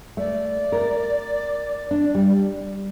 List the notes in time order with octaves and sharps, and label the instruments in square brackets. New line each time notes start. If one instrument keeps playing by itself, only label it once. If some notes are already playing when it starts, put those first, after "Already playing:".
[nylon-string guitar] A3 [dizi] D5
[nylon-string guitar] A#4
D4
G3